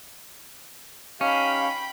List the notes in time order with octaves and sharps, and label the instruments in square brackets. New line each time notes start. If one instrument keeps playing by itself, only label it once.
[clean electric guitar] C#4 [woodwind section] D#4 G4 F5 [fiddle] G5 B5